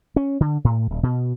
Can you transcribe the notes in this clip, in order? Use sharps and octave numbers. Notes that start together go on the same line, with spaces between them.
C#4
D3
A2
D#1
B2